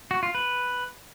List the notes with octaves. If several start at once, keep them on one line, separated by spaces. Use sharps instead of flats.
F#4
F4
B4